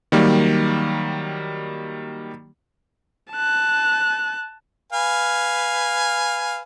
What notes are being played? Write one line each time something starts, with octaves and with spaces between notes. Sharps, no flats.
D#3 F#3 G3 A#3
A5 F#6
B4 F5 G#5